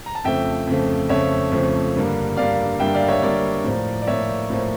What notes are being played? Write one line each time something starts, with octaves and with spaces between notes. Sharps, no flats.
A#5
A5
F2 C#3 F3 A3 E5 G5
F2 C#3 F3 A3
F2 C#3 F3 A3 C#5 E5
F2 C#3 F3 A3
G2 D3 G3 A#3
G2 D3 G3 A#3 D5 F5
G2 D3 G3 A#3 E5 G5
D5 F5
C#5 E5
G2 D3 G3 A#3 A#4 D5
A2 F3 A#3
D5
A2 F3 A#3 C#5 E5
A2 F3 A#3